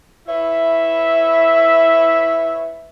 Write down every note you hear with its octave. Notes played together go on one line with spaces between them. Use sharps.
E4 B4 C#5 E5